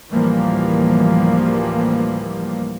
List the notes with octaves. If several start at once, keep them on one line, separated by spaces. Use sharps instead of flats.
A1 D2 E3 F3 G3 A#3